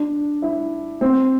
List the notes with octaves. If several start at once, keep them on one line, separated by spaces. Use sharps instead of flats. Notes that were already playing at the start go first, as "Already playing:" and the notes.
Already playing: D4
E4
C4